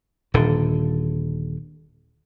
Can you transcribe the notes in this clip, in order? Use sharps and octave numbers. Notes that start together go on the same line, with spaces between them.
D#1 D3